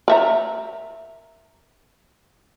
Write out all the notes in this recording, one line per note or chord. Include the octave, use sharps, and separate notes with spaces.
A#4 E5 A#5